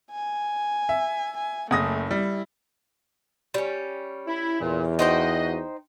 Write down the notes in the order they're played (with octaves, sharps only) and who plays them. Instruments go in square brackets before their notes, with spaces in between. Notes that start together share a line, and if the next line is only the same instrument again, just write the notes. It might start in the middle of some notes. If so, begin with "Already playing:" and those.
[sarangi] G#5
[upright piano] E5
[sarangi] G#5
[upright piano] F#1 D#6 A#6 [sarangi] A3
[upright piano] G3 [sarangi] E4
[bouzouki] G3 C#4
[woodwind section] E4
[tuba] E2 [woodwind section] A#2
[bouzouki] D#4 C5 G5 [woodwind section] F#4 D#5